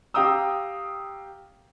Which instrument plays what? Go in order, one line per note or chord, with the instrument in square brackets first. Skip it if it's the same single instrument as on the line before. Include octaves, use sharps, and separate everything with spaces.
[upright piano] G4 F5 G5 A#5 D#6 E6